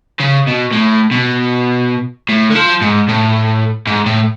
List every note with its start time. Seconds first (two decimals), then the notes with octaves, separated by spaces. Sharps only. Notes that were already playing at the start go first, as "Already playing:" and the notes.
0.20 C#3
0.47 B2
0.72 A2
1.11 B2
2.29 A2
2.50 D3
2.55 F3
2.81 G#2
3.08 A2
3.87 G#2
4.06 A2